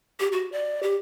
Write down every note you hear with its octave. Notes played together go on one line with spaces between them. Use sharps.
G4
F#4
D5
G4